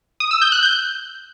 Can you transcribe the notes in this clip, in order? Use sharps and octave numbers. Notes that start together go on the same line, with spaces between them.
D#6
E6
G6
F#6
G6